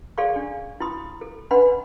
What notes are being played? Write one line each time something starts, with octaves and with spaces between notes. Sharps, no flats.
G#4 A4 D5 F5 C6 C#6
D4
E4 B5 C6 D#6
A4
D4 B4 D#5 F#5 B5 C6